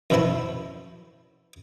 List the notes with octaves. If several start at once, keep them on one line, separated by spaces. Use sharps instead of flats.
F#2 B2 F3 E4 E5 A5